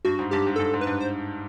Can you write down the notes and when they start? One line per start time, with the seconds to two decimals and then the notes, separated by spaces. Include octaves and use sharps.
0.05 G2 F#4
0.19 G#2
0.31 G2 G4
0.47 G#2
0.56 G2 A4
0.74 G#2
0.81 B4
0.87 G2
1.01 C5